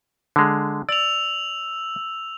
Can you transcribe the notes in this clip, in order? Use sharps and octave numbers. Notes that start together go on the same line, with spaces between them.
D3 G#3
D5 E6 F7